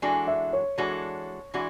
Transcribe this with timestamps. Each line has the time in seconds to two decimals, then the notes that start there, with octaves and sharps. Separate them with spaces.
0.02 E3 G#3 D4 F#4 A4
0.27 E5
0.53 C#5
0.78 E3 G#3 D4 F#4 A4
1.54 E3 G#3 D4 F#4